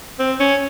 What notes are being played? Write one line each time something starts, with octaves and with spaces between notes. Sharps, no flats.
C4
C#4